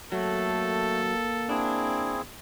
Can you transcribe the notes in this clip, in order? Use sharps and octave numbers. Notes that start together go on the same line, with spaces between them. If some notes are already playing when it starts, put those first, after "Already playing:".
F#3 A3 A#3 A4
C4 D4 E4 G#4